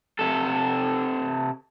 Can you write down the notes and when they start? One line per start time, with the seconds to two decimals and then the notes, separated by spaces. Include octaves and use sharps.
0.19 C3 A4